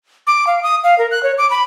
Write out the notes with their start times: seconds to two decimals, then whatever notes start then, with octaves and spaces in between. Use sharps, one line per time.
0.27 D6
0.47 F5
0.63 D#6
0.84 F5
0.98 A#4
1.11 F#6
1.23 C#5
1.38 D6
1.50 B5